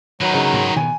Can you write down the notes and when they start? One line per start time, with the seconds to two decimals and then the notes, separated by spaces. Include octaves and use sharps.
0.21 D#3 F#3 B4
0.34 C#3 D#4
0.53 G#2
0.76 B2 G#5